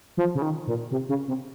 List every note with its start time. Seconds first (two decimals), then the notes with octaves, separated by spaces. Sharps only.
0.17 F3
0.35 C#3
0.42 D#3
0.67 A#2
0.91 C3
1.09 C#3
1.28 C3